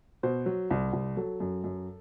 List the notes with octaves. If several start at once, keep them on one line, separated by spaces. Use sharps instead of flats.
B2 C5
F#3
C2
C2
F#3 A4
F#2
F#2